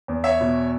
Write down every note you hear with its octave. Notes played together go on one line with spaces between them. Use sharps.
E2
C#5 E5
B2